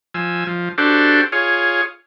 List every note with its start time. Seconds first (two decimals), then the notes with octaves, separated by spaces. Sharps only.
0.14 F3 G#5 E6
0.47 F3
0.78 D4 F#4 G4 A4 C5
1.32 F4 G#4 C#5